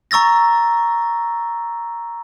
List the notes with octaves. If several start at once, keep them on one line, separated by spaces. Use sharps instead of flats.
A#5 C#6 E6 A6 A#6